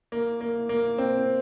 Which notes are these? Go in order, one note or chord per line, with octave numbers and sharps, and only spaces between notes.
A#3
A#3
A#3
C4